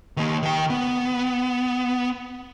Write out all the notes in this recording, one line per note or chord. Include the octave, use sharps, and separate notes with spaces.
D#3 A#3
D#3 G5
B3